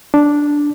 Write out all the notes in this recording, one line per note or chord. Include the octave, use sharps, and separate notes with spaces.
D4